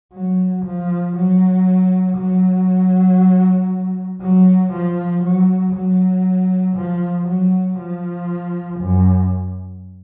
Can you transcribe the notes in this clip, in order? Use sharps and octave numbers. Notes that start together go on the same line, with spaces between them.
F#3
F3
F#3
F#3
F#3
F3
F#3
F#3
F3
F#3
F3
F#2